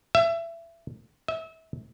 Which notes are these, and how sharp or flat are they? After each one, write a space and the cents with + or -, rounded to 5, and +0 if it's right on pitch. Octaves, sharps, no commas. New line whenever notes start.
E5 +25
E5 -30